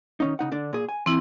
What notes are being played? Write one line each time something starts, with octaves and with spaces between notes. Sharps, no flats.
D#3 C#4 D#4
C#3 D#4 F#5
D3 D4
A#2 G#4
G#5
E3 C4 E4